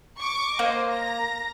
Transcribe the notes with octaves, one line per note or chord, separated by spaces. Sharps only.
C#6 D6
A#3 C5 D#5
A#5 A#6